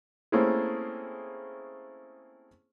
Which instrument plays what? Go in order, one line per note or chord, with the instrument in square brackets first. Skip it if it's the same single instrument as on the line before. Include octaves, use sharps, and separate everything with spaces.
[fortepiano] A3 A#3 C4 C#4 E4 G#4